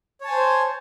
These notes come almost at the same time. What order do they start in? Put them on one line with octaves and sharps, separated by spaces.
C#5 A5 G#5 C5